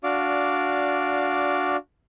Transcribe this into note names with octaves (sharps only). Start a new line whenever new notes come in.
D4 F#4 D5 F5 D6